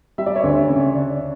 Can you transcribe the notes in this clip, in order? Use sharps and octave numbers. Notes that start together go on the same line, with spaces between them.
G3 E5
D5
C#5 E5
D2
C#3
D4